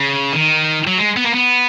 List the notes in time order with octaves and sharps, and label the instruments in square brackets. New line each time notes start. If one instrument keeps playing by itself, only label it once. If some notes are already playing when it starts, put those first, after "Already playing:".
Already playing: [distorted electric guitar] C#3
D#3
F#3
G#3
B3
A#3
B3